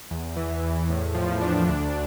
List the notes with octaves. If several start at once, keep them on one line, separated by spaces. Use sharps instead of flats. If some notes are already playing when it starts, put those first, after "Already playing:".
E2
E3
E2
A2
F3
D4
D2